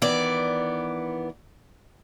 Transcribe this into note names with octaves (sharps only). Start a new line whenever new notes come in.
D#3 E3 B3 D5